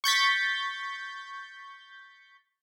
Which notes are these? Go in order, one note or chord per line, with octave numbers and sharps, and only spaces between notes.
C#6 G6 A6 B6